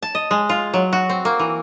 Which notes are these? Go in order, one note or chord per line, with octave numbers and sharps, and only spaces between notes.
A5
D#5
G#3
F4
F#3
F#4
C4
A#3
E3